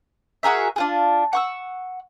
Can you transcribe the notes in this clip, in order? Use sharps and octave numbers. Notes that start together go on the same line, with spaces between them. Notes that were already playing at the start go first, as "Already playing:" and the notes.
F#4 G#4 A#4 E5
D4 F4 G#4
F#5 C#6 E6